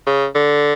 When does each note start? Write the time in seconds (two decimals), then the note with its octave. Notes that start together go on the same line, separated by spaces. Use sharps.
0.07 C#3
0.35 D3